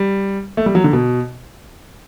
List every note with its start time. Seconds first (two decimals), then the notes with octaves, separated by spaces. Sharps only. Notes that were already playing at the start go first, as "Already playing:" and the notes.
Already playing: G3
0.57 A3
0.66 G3
0.75 F#3
0.84 D3
0.93 B2